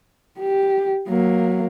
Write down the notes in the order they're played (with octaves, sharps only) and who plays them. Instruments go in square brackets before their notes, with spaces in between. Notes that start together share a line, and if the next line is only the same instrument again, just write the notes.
[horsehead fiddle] G4
F#3 A#3